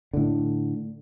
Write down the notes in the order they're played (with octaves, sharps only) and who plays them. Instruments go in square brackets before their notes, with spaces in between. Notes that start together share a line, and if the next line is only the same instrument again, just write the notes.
[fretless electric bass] A2 D3